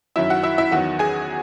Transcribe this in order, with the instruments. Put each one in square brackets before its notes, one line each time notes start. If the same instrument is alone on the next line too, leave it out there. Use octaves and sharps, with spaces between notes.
[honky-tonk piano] F#2 D#3 F#3 E4 E5
F#4 F#5
E4 E5
E4 E5
E2 D#3 F#3 F#4 F#5
G#4 G#5